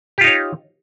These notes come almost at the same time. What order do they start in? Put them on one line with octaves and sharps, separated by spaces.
G4 F4 D#4 C#5